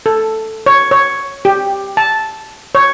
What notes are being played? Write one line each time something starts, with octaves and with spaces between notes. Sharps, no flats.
A4
C#5
C#5
G4
A5
C#5